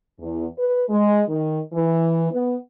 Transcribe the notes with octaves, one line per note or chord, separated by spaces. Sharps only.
E2
B4
G#3
D#3
E3
B3